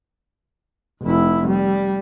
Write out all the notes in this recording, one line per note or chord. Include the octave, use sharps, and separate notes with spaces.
F1 E4
G3